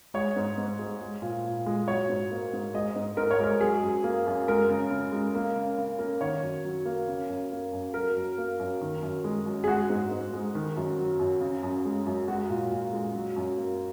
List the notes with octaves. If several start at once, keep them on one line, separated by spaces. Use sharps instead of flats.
G#3 C#5
G#2
G#2
G#3
G#3
A#2
A#2
G#3
F#3 C#5
G#2
A#3
G#2
G#3 D#5
G#2
G#2 A#4
C#5
G#3 A#4
F#3 G#4
F#2
A#3
F#2
G#3 A#4
C#3
C#3
G#3
A#3
C#3
C#3
A#3
D#3 C#5
F#2
F#3
A#3
C#3
F#2
A#3
F#2
F#3 A#4
F#2
A#3
F#2
D#3
F#2
G#3
F#2
G#4
G#3 F#4
G#2
G#2
G#3
D#3
F#2
F#3
F#2
C#3
F#2
G#3
F#2
G#3 F#4
A#2
A#2
G#3
F#3
F#2
A#3